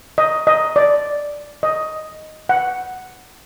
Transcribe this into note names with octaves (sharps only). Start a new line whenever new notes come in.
D#5
D#5
D5
D#5
F#5